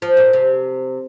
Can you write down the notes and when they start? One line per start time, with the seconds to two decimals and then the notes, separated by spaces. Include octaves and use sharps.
0.02 F3
0.17 A#2
0.33 C3